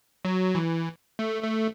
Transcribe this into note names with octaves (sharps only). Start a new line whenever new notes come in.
F#3
E3
A3
A3